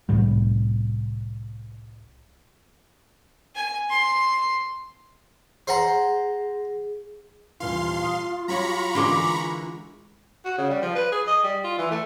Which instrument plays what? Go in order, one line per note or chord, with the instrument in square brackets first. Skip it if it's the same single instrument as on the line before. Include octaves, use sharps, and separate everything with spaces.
[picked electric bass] C2 A2 G3
[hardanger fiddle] G#5
C6
[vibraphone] G#4 [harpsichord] C5 F#5 A#5
[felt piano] D#1 E3 [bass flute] F4 [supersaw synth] F5 C6
[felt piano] D#6
[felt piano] F#3 G4 C#5 [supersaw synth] A#5 B5 C#6
[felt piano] D3 E3 G#3 [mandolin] A#3 C6 D6
[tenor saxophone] F#4
C#3
G3
F3
B4
G#4
D#5
G3
F4
E3
A3